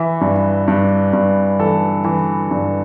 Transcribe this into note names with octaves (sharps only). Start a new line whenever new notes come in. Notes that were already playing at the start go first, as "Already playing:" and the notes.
Already playing: E3 E5
G2
G2
G2
E3 A4
E3
G2